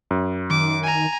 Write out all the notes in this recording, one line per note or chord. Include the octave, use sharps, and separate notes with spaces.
F#2
D#3 D6
G#5 A#5